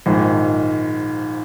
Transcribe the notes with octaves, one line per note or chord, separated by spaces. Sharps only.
A#1 G#2 D#3